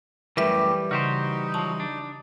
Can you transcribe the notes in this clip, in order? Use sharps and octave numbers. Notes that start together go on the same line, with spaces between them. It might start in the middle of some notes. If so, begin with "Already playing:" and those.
F#2 A2 E3 G3 G4 A#4 B4 E5
C#3 D#4 F#4 G4 C5
F3 F#3 A5
D4